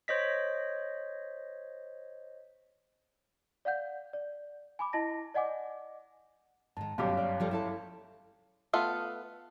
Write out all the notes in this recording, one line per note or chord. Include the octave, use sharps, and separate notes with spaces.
C5 C#5 D#5 B6
D5 F5 F#5 G6
D5
G#5 B5 D6
E4 D#5 A5 A#6
D5 D#5 F#5 G#5 D6
G#2 D#3 A5
G1 F#2 B2 G3 F#4 G4 C#5 F5
D5
F3 G3 A4
E4 A4 A5
A3 B3 F4 A4